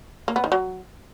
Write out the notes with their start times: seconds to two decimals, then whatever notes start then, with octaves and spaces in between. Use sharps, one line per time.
0.28 A#3
0.36 B3
0.44 D#3
0.52 F#3